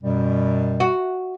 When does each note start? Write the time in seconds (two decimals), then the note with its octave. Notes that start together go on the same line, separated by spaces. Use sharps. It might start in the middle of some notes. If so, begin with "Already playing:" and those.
0.03 F#2 B2 G3
0.80 F#4